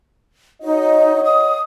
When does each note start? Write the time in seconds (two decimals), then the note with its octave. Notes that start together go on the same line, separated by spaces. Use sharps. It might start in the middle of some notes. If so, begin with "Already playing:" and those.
0.62 D#4 F#4 C#5 D#5
1.23 D#6